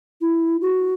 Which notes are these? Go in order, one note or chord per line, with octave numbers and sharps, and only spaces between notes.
E4
F#4